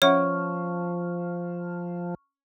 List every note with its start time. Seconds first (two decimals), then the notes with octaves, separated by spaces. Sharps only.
0.02 F3 C#4 C#5 E5 F#5 C#6 F6